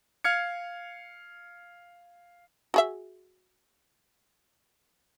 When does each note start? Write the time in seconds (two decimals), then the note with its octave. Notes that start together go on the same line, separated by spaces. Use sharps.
0.24 F5 F6 G#6 C#7
2.74 F#4 G#4 E5